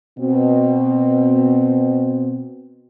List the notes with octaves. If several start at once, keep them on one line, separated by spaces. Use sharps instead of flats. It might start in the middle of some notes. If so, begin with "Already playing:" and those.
B2 C4